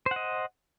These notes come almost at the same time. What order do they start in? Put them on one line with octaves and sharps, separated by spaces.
C5 F#5 D#5